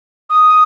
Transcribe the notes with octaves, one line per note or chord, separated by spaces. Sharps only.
D#6